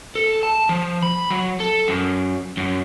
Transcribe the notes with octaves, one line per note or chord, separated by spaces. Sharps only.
A4
A5
F3
B5
F#3
A4
F#2
F#2